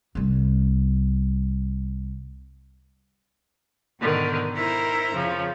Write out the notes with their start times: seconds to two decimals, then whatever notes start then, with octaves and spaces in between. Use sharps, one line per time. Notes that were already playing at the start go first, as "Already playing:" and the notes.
0.15 C2 G3
4.00 G#2 B2 D3 D#3
4.54 D#4 E4 A#4 C5 A#5
5.13 F2 C#3 F3